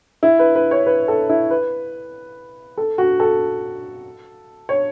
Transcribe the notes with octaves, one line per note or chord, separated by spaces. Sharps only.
E4
B4
B4
C#5
B4
A4
E4
B4
A4
F#4
A4
C#5